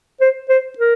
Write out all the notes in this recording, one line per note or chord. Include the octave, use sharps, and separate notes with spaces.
C5
C5
A#4